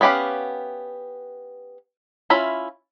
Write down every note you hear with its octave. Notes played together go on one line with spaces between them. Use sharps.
B3 C#4 G4 B4 F5
C#4 E4 F4 E5 B5